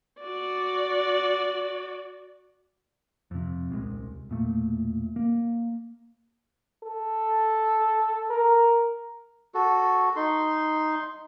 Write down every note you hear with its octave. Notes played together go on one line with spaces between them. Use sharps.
F#4 D5
F2 C3
D#1 C2 G#3
E1 A#2 A3
A#3
A4
A#4
F#4 A4
D#4 C6